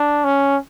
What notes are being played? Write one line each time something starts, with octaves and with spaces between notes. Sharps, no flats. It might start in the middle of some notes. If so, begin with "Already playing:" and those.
Already playing: D4
C#4